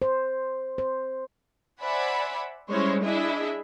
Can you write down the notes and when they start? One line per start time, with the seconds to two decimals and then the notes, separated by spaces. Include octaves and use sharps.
0.02 C5
0.78 C5
1.81 C5 D5 E5 F#5 G#5 B5
2.70 G3 G#3 C#4 E4 C5 C#5
3.03 D4 E4 G#4 D#5 E5